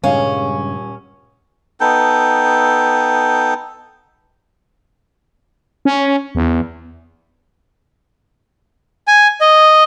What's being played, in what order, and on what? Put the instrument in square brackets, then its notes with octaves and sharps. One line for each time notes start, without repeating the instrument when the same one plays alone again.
[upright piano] D#1 G#5 [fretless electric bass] G2 C#3 G#3 [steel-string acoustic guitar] C#4 [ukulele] F5
[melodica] B3 D#4 A4 G5
[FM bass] C#4
E2
[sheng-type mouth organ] G#5
D#5